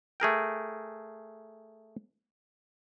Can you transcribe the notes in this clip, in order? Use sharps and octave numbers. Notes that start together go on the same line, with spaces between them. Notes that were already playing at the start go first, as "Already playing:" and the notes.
A3 G#4 A#4 G5